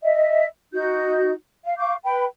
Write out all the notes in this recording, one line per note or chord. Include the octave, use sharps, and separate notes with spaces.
D#5 E5
D#4 F#4 G6
F5
F5 C#6 D6 G6
B4 G5 B5